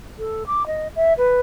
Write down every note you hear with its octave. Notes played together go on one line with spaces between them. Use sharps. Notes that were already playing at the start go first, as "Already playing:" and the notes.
A4
D6
D#5
E5
B4